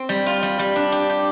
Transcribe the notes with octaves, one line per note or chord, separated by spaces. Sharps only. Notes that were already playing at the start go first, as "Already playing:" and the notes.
Already playing: C4
G3
F4
G3
G3
D4
G4
G4